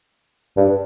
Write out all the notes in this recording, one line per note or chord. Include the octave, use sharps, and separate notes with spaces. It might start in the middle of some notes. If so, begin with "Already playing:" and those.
G2